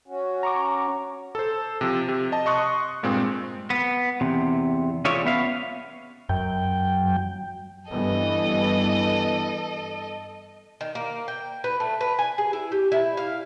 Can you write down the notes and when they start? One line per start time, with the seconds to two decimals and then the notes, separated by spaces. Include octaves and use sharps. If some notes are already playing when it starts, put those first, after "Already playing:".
0.08 C#4 F#4
0.43 A#5 C#6 D6
1.35 A4 C5
1.81 C3 F3
2.09 C3 G4
2.32 D#5 A5
2.46 D#5 C6 C#6 D#6 F#6
3.03 G2 A#2 G#3 C4
3.70 B3
4.21 E2 C3
5.05 C#4 F4 G#4 C#5 D5 E5
5.25 B3 E5 F5
6.29 F#2 F#3 G5
7.91 G2 E3 B3 A4 D#5
10.81 D#3
10.95 A#3
11.28 G5
11.64 B4
11.80 A3
12.01 B4
12.19 G#5
12.38 G#4
12.53 E4
12.72 G4
12.92 E4
13.17 F5